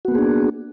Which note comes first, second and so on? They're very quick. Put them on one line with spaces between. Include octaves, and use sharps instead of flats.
F#4 B3 A#3 G#4 D4